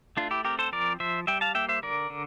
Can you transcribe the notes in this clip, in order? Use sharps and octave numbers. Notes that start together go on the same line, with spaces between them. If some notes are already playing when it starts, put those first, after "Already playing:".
A3 D4 F4
E4 G4
C4 G4 A#4
A4 C5
F3 A#4 D5
F3 C5 E5
G3 E5 G5
F5 A5
A#3 E5 G5
C5 E5
D3 A#4 D5
D3